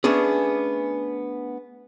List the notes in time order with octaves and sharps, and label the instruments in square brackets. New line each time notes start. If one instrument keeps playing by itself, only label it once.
[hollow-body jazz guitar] A3 B3 C#4 D4 G#4